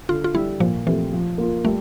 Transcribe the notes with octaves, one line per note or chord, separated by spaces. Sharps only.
D3 F4
F4
G3 D4 E4
A#2 F3
E3 F3 A3 C4 G4
F3
A#3 F4
G3 A3